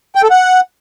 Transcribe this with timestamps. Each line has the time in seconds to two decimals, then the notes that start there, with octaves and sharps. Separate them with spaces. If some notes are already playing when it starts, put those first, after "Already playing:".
0.15 G5
0.23 A4
0.31 F#5